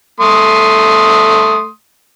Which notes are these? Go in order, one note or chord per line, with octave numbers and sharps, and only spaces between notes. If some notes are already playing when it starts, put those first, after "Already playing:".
A3 C6 D#6